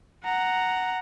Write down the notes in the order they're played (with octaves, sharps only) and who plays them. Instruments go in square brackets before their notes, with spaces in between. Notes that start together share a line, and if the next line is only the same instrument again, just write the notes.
[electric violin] F#5 A#5